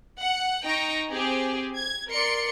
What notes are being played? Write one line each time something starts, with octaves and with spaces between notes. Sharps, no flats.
F#5
D#4 G5 A#5 C#6
C4 G4 G#4
G#6
A#4 D5 C6 C#7